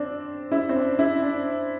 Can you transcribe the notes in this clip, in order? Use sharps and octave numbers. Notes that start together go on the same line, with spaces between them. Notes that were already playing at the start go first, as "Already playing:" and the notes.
Already playing: C4 D4
E4
C4
D4
E4
D4